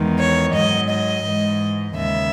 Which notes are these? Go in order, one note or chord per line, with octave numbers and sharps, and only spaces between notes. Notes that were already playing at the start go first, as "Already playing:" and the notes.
Already playing: E2 D#3 G#3
C#5
G#2 F#3 D#5
D#5
G#2 E3 G#3
D#2 C#3 G#3 E5